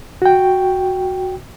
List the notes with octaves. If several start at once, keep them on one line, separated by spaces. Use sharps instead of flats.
F#4 G5